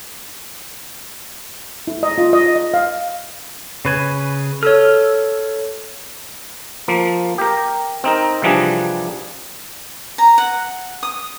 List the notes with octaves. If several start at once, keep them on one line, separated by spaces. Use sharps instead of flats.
E4
D#5
F4
D#5
D#5
F5
C#3 B4 G#5
A4 C#5 E6 F6
F3 A#3
G4 A#4
C4 D#4 A#4
C2 E3 F3 G3 D4 G#4
A#5
F#5
D#6